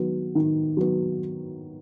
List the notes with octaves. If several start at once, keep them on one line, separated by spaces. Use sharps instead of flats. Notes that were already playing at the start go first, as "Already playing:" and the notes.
Already playing: D#3 F#3 B3
D#3
F#3 B3